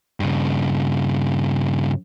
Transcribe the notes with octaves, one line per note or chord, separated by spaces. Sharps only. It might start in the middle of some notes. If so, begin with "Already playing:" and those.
G2 C#3